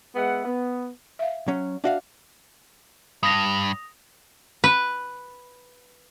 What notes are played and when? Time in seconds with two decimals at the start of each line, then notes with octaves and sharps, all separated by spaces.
0.15 G#3 B3 E5 F#5
0.45 B3
1.19 E5 F5
1.48 F#3 C#4
1.84 D4 F#4 E5 F5
3.23 G2 D#6 A#6 F7
4.64 B4